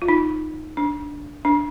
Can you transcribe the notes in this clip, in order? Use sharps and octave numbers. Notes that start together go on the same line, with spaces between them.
F4
D#4
D4
D4